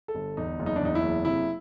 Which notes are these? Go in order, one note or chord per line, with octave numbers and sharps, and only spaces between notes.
A4
G1
E2 D#4
F#1
D#4
D4
E2 D#4
E4
F#1
C3 E4